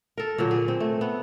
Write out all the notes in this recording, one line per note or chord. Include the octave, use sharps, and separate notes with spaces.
A4 A#4
A#2 D3 F#3 A#3
G#4
C4
A3
B3